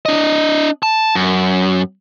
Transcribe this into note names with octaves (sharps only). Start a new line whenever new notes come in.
D4 D#5
A5
F#2